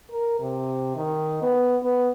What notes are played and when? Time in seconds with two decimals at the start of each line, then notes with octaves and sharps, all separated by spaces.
0.11 A#4
0.40 C3
0.96 D#3
1.42 B3
1.83 B3